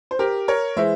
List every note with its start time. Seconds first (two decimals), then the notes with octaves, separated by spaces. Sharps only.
0.11 C5
0.19 G4 A#4
0.48 A#4 C#5
0.76 E3 G#3 C5 E5